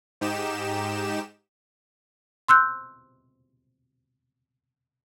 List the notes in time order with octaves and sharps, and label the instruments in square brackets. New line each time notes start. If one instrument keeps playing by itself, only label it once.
[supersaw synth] G#2 D#4 G4 E7
[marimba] C6 E6 F#6 G6